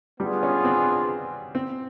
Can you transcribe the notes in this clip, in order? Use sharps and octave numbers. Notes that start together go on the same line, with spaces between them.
G3 B3 D4 F4 G#4
C#4
C4
C4